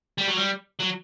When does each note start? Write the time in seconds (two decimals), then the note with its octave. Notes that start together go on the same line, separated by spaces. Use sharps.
0.18 G3
0.28 F#3
0.37 G3
0.80 F#3